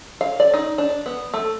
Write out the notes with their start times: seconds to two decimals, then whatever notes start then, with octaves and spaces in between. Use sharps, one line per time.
0.21 F5
0.40 D5
0.54 D#4
0.78 D4
1.06 B3
1.34 A3